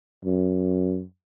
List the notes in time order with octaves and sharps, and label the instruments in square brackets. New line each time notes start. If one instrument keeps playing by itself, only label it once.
[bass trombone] F#2